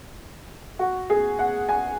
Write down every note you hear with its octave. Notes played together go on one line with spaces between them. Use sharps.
F#4
G#4
F#5
G#5